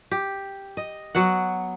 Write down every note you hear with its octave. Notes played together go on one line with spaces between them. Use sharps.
G4
D#5
F#3 B3 F#5